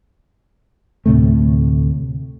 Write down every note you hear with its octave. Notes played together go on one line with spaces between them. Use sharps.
D2 A2 C3 A3